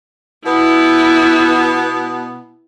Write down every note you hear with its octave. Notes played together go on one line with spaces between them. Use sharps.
B2 B3 E4